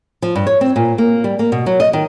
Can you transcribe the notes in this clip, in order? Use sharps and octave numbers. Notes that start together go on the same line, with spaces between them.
F3
G2
C#5
C4
A#2
A#3
G3
A#3
B2
F#3
D#5
D#3